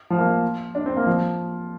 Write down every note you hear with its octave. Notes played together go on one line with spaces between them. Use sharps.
F3
A#3
D4
C4
A#3
F3